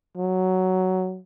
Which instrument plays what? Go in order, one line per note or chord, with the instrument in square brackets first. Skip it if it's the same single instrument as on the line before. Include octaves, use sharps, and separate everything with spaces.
[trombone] F#3